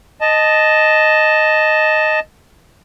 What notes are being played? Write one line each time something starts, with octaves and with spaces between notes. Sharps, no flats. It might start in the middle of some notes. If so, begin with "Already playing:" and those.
D#5 A5